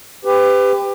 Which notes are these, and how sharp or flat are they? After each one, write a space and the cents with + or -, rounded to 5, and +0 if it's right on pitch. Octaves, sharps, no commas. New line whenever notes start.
G4 +20 B4 +30